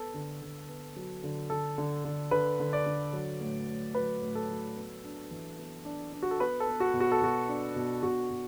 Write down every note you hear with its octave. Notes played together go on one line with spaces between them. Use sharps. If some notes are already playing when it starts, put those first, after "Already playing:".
Already playing: B3 A4
D3
D3
B3
F#3
D3
D3 A4
D3
D3
D3 B4
D3
D5
D3
F#3
A2
A2
F#3 B4
A2
A4
F#3
B3
D4
E3
B3
D4
D4
F#4
A4
B3 B4
A4
B3
F#4
B2
F#4
A4
B2 F#4
D4
B2
B2 F#4
B2